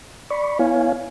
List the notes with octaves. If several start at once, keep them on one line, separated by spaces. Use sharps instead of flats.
D5 B5 C#6
B3 E4 C#5 F5 G#5